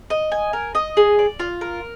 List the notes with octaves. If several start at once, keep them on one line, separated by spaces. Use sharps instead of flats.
D#5
G#5
A#4
D#5
G#4
D5
F4
A#4